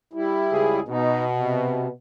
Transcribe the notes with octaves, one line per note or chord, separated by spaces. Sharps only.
G3 E4
C#2 G#4
B2 D#4
C3